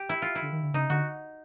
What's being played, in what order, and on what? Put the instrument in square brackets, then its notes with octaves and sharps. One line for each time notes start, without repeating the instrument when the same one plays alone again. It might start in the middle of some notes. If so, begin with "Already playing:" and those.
Already playing: [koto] G4
E4
F4
E4
[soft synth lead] D3
D#3
D3
[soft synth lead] C#3 [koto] D#4
[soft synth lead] D3 [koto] F#4